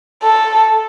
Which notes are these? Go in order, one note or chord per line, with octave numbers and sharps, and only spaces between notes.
A4